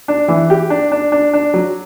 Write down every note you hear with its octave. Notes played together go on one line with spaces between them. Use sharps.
D4
E3
G4
D4
D4
D4
D4
F#3